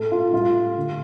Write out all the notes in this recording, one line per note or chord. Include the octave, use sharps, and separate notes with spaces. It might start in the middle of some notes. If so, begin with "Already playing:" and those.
Already playing: A2 A3 A4
F4
A2 G3 F4
D3 A3